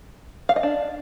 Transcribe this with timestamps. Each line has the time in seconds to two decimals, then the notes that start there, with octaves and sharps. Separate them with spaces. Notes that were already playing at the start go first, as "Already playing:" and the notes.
0.49 F5
0.56 D#5
0.63 D4